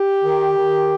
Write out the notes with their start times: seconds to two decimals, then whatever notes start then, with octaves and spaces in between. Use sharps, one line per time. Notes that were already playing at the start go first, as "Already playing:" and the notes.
Already playing: G4
0.23 D#3
0.57 D#3